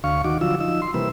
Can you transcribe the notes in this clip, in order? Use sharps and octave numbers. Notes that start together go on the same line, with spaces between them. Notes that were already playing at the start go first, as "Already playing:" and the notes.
D2 F5 C#6
D#2 D#3 F#4 D6
D3 F3 F#3 F4 E6
F3 D#4 E6
C6
C3 E3 G3 A#3 B4 E6